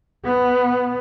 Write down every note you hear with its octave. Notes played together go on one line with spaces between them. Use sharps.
B3